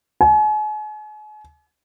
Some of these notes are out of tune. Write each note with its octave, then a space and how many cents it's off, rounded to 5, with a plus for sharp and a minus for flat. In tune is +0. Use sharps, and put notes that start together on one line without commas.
G#5 +40